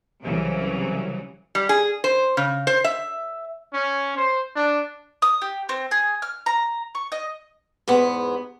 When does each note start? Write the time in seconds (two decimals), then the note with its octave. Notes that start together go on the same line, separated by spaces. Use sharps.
0.23 C2 C#3 E3 F#3
1.55 G3
1.69 G#4
2.04 C5
2.37 C#3
2.67 C5
2.84 E5
3.73 C#4
4.17 C5
4.56 D4
5.22 D#6
5.42 G4
5.69 C4
5.91 G#4
6.22 F6
6.46 A#5
6.95 C#6
7.12 D#5
7.88 E2 G#2 B3